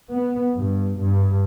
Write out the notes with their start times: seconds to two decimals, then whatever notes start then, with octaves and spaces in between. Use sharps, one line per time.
0.12 B3
0.55 G2
1.00 G2